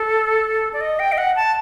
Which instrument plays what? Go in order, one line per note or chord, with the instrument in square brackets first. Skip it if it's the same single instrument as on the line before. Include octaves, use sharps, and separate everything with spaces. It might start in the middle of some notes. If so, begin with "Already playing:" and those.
Already playing: [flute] A4
D5
D#5
G5
D#5
F#5
A5